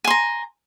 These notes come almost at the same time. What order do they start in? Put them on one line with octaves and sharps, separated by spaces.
G#5 C6 A#5